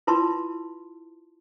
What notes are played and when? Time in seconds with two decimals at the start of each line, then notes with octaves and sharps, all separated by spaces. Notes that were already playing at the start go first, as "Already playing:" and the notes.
0.07 E4 F4 B4 A5 C6